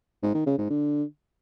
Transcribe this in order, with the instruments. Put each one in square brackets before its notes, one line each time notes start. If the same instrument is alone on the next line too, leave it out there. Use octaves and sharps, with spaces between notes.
[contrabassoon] G#2
D#3
C#3
G#2
D3